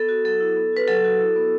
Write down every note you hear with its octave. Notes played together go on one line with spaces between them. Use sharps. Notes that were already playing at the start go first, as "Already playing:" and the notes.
Already playing: B3 A4
F#4
F#3 A4
E4
B3
F#4 B4
F#3 A4
F#4
E4
B3